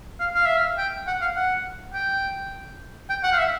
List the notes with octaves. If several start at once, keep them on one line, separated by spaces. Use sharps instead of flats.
F5
F5
E5
F5
G5
F#5
F5
F#5
G5
G5
F#5
F5
E5